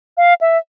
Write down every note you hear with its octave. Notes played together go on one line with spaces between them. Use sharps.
F5
E5